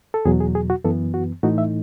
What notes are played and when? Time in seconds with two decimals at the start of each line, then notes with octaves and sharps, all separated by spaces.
0.14 A4
0.25 E2 B2 F#3 G#4
0.40 G#4
0.55 G#4
0.70 F#4
0.84 F#2 E3 B3 A4
1.14 F#4
1.43 A2 E3 A3 D#4 F#4
1.58 E5